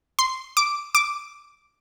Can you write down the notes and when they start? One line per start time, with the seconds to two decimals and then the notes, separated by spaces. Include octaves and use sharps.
0.19 C6
0.57 D6
0.95 D6